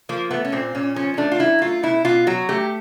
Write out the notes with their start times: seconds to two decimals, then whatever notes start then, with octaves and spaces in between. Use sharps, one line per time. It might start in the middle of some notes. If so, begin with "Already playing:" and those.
0.09 F3 A#3
0.31 A3 B3
0.45 C#4
0.52 A#2 C4
0.75 A#2 C#4
0.96 F3 C#4
1.14 C#4
1.17 A3 D4
1.32 F4
1.40 F#3 E4
1.62 A3 F4
1.83 B2 E4
2.05 B2 F4
2.27 F#3 F#4
2.49 A3 G4